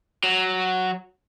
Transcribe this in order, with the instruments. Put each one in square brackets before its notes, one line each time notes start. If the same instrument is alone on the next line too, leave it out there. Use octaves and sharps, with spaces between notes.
[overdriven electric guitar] F#3